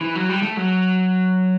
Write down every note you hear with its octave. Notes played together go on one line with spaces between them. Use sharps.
E3
F#3
G3
A3
F#3